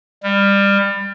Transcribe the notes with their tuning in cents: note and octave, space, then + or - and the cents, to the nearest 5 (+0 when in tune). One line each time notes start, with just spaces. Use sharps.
G3 +25